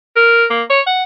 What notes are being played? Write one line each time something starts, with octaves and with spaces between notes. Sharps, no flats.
A#4
A#3
C#5
F#5